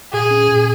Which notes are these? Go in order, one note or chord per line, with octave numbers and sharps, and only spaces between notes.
A#2 G#4
C#4
A#2